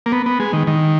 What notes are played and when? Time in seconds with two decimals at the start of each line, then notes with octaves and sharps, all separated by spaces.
0.06 A#3
0.12 B3
0.26 B3
0.40 G#3
0.53 D#3
0.67 D#3